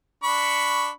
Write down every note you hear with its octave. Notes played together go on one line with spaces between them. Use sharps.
D4 B5 C#6